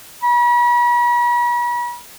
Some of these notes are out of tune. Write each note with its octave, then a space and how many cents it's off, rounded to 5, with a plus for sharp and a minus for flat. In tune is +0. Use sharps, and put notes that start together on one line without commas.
B5 -40